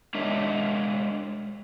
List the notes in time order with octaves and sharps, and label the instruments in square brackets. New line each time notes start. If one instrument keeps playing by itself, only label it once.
[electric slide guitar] G#3 D4 A#4 C#5 E5